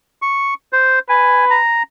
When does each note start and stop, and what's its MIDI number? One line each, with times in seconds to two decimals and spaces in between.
0.22 0.54 85
0.73 0.99 72
1.09 1.57 71
1.09 1.45 80
1.51 1.83 82